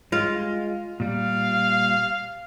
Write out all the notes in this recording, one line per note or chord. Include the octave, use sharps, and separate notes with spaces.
G#3 F4
A#2 G3 F5